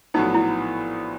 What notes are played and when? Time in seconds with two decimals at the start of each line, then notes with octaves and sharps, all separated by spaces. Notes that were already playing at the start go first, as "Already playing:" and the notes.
0.14 A#1 A2 F#3 B3 D#4
0.34 E4